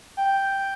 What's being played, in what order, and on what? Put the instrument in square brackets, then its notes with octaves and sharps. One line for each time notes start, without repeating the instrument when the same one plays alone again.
[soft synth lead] G5